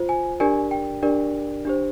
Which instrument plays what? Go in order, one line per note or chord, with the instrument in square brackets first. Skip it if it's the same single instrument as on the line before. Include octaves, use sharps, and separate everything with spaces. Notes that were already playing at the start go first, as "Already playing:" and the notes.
Already playing: [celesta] F4 C5
G#5
D4 G4 A#4 D5 G#5
G5
D4 G4 A#4 D5
D4 G4 C5